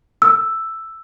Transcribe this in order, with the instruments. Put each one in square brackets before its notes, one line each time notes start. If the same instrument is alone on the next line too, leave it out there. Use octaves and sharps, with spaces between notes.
[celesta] E6